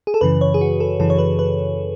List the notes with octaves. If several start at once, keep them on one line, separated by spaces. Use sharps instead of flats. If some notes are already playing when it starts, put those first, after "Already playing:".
G#4
A4
F#2 C#3 E3 B4
C#5
G#4
F#4
A4
F#2 C#3 E3 A4
C#5
B4
B4